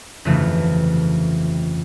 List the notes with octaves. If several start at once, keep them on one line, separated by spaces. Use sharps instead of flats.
G1 F2 C#3 E3 A3